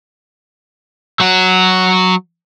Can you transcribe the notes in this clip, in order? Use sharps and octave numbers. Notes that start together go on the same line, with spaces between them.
F#3 F#4